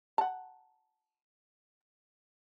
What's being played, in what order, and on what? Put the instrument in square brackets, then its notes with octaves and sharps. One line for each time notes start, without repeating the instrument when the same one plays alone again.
[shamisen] F#5 A5